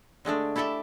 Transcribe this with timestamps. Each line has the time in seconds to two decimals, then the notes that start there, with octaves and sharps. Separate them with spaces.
0.25 D3 G#3 A3 D4
0.56 E4 G4 A4 D5 E5